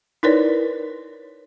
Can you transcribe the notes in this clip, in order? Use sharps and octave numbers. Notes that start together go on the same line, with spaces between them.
D#4 E4 A#4 B4 C#5 D5